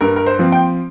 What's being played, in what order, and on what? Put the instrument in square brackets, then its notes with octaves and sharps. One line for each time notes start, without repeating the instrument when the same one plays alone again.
[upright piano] G2 A#4
A#4
C5
F3 C4
G5